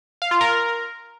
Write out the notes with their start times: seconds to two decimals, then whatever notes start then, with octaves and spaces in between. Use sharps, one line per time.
0.22 F5
0.31 F4
0.41 A#4